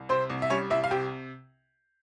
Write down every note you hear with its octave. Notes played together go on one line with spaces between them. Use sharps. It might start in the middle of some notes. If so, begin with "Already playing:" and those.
Already playing: C2
C3 C4 C5
C2
E5
G3 C#4 C#5
C2 E4 E5
F5
C3 G4 G5